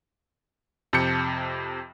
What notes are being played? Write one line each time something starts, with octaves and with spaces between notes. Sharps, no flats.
F2 C3 A5 G6 C#7